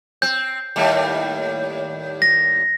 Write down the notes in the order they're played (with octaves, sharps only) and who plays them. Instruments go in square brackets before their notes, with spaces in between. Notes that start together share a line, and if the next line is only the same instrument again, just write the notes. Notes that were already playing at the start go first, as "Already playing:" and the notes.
[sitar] C4 [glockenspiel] G6
[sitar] D#2 A2 G3
[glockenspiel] A#6